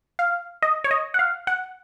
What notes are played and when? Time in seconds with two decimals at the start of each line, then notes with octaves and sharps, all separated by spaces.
0.19 F5
0.63 D#5
0.84 C#5
0.91 D#5
1.14 F#5
1.19 F5
1.47 F#5